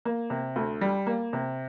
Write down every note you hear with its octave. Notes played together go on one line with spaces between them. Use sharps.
A#3
C3
D2
G3
A#3
C3